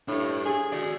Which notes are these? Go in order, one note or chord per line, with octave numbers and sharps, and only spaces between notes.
A2 D4 G4
G#4
F#4 D5